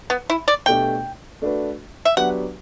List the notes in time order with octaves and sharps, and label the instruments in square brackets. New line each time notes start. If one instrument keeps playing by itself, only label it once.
[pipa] B3
E4
D5
[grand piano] B2 A3 D4 G4 D5 [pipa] G5
[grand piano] A3 D4 F#4 B4
[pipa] E5
[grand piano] F#3 B3 D4 G4 B4 [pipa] F#5